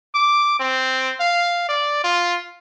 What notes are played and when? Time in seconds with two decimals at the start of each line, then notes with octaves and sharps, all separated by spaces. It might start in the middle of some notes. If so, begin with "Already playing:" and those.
0.15 D6
0.59 C4
1.20 F5
1.68 D5
2.04 F4